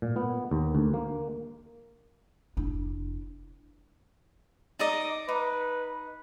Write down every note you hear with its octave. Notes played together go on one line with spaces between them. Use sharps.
A#2
B3
D#2
D2
A#3
F1 D4 E4
D#4 D5 D#5
D#4 B4